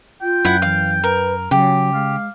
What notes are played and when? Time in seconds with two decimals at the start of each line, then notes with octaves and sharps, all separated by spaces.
0.22 F4 G5
0.45 F#2 E4 F#5
0.62 E3 F5
1.04 A#4 B4
1.51 C#3 F#3 G4
1.94 G#3 F5